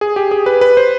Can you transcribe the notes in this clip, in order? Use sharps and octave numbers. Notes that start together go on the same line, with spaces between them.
G#4
G4
G#4
B4
B4
C5